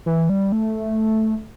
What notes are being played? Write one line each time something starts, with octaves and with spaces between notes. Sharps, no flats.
E3
G3
A3